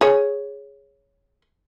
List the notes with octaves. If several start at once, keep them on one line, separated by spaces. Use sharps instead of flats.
G#4 C#5